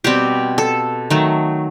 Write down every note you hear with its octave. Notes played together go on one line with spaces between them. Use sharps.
B2 G3 C4 G4
A4
D#3 F#3 A3